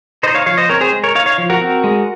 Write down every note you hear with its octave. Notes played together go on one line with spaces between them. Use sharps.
D#4 C5 D#5
C#5 F5
F3 C#5 F5
C5 D#5
C4 A#4 C#5
G#4 C5
G#3
A#4 C#5
D#4 C#5 F5
C#5 F5
F3
F#4 A#4
C4
G#3